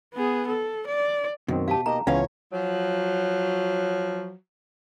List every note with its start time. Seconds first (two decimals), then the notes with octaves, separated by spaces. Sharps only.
0.14 B3 G#4
0.47 A4
0.87 D5
1.48 F#2 B2 D#3 C4
1.68 G4 F5 A5
1.86 A#3 D#4 G4 D#5 A#5
2.07 C#2 E3 B3 C#4 F4 C#5 F5
2.53 F3 F#3